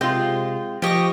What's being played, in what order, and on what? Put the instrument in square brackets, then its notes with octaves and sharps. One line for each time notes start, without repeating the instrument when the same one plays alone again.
[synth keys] C3 [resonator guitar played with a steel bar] G#3 F4 [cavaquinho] G5
[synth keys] F3 C#6 A#6 [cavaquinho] G4 D#5